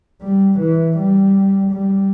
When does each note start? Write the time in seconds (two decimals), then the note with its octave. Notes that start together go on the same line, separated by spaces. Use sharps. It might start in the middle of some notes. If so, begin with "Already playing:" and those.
0.22 G3
0.60 E3
0.97 G3
1.71 G3